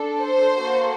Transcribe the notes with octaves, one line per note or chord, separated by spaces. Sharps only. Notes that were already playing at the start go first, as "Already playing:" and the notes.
Already playing: D4 A4
C5
A#3 F#4 A4